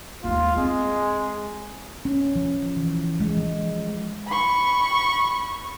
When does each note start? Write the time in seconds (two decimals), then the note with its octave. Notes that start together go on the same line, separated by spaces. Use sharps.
0.24 D#2 G#3 F4
0.56 G#3 C4
2.05 C#4
2.36 F3
2.77 E3
3.20 G#3
3.37 F3
4.27 B5 C#6